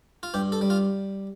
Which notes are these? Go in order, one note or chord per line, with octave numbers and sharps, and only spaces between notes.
F4
G2 G4
A4
G3
F4